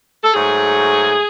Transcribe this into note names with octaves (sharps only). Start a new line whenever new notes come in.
A4
G#2 F#3 A3 G#4